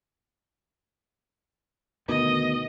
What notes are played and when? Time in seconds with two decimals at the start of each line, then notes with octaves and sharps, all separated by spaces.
2.08 D2 B2 D#3 D#5